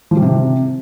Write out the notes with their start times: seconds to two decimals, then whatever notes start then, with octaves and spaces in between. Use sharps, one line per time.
0.11 F3
0.17 G3
0.22 C3